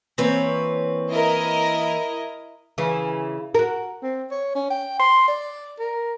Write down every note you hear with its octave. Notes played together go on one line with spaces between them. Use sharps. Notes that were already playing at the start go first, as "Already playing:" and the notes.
E3 A#3 C4 B4 C#5
E4 A#4 D#5
C#3 E3
F#4 A#4
C4
C#5
C#4
G5
C6
D5
A#4